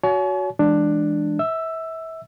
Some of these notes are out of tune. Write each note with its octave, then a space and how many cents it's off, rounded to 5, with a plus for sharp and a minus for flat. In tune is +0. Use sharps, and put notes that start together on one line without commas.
F#4 +0 C#5 +30 G#5 +45
E3 +0 G#3 +0 D4 +10
E5 -30 E6 +10